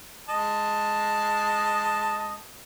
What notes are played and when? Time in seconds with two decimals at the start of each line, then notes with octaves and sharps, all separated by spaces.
0.29 G#3 D#5 A5